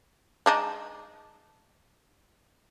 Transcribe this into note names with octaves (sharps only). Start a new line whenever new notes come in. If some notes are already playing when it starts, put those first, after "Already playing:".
G#3 D4 D#4